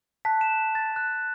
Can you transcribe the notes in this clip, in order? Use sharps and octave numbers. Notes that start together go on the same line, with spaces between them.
A5 F#6 B6
E7
A6
A5 F#6